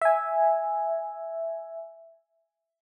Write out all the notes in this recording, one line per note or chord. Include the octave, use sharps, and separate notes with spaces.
E5 G#5